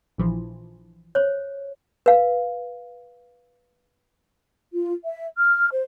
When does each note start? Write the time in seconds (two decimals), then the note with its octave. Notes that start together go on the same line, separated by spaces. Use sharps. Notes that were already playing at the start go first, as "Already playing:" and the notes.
0.18 A#1 E3 F3
1.15 C5 C#5
2.06 B4 F5
4.73 F4
5.05 E5
5.38 F6
5.71 C5